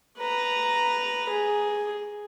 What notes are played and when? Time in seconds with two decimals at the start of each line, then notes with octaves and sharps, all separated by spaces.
0.19 B4 A#5
1.30 G#4